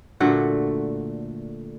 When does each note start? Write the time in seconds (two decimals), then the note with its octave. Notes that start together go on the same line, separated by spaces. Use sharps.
0.20 A#2 D3 A3 F#4